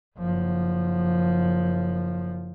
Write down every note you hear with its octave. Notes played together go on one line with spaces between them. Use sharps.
F#1 F3